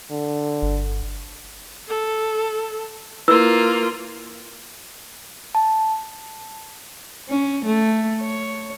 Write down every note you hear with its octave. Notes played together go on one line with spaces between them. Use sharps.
D3
G1
A4
A#3 E4 F4 B4 E6
A5
C#4
A3
C#5